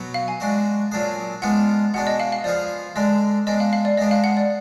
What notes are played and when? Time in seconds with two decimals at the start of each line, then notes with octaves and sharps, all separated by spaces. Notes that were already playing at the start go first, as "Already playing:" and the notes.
Already playing: B2 F#3 B3
0.14 F5
0.28 G#5
0.40 G#3 D4 F#4
0.91 A#2 F#3 D4 G#4
1.42 G#3 B3 D4 F4 F#5
1.94 B2 G#3 D4 F#5
2.07 D#5
2.20 F5
2.32 F5
2.44 F3 B3 F4 G#4 D5
2.96 D3 G#3 D4 D#5
3.47 G#3 B3 D4 D#5
3.60 F5
3.73 F5
3.85 D5
3.97 G#3 B3 D4 D#5
4.11 F5
4.24 F#5
4.37 D5